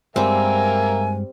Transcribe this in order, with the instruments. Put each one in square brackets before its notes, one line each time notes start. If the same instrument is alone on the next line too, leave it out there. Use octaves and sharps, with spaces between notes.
[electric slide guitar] G2 G#3 [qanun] G3 C4 [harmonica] A#3 A#4 E5 [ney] G#5